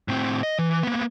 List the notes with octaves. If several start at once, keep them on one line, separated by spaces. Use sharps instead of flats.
A2 C4
D#5
E3
A#3 B3